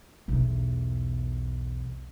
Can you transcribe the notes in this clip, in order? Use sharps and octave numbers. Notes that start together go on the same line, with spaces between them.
B1 E2